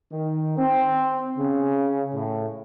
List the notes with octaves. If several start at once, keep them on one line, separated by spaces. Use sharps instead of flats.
D#3
C4
C#3
A2